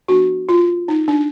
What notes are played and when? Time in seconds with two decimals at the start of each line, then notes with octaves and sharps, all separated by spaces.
0.08 F3 B3 D4 F#4
0.49 F4
0.88 D#4
1.08 D4